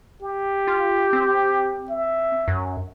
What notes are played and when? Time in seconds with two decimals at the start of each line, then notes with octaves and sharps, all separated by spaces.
0.22 G4
0.67 F4
1.13 C4
1.90 E5
2.48 F#2